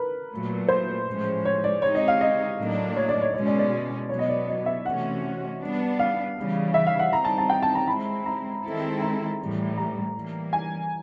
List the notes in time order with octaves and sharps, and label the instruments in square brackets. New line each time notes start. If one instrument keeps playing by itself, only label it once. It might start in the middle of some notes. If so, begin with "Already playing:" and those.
Already playing: [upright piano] A#4 B4
[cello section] A#2 F#3 A3
[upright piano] C5
[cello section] A2 F3 G#3 C#4
[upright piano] C#5
D5
[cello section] G#3 C4 D#4 G4 [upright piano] C#5
[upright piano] D#5
F5
D#5
[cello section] A2 F#3 A#3 D4
[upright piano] C#5
D5
C#5
[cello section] B2 G#3 C#4 [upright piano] C#5
[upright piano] D5
D5
[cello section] B2 F#3 B3 [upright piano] C#5
[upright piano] D#5
D5
D#5
E5
[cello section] C3 E3 A3 C#4 F#4 [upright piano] F#5
[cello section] G3 B3 D4
[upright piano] F5
[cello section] C#3 E3 G3
[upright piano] E5
F5
F#5
[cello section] G3 C4 D#4 [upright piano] A#5
[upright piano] A5
A5
G5
A5
A#5
[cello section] G#3 C4 E4 [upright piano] B5
[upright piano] A#5
[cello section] D#3 G#3 C4 E4 A4
[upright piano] A#5
[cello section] A2 E3 G3
[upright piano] A#5
[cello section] E3 G3 A#3
[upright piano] G#5